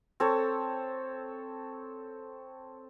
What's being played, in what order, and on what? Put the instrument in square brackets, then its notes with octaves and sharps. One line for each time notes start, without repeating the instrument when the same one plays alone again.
[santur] C4 A4 C#5